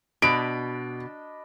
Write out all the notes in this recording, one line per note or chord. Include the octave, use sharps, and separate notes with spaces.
B2 D4 D#5 B5 D7